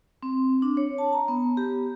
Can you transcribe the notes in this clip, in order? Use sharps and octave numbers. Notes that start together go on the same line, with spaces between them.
C4
D4
C#5
A5
A#5
B3
G4